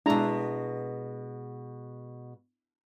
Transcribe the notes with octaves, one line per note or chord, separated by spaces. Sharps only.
B2 G#3 D4 E4 A#5